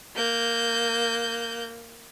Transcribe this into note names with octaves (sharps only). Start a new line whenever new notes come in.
A#3 G6